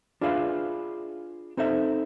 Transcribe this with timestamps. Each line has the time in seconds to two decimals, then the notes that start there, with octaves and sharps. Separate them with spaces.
0.21 D4 F4 G#4 B4 E5 F5
1.57 C4 D#4 A4 C5 E5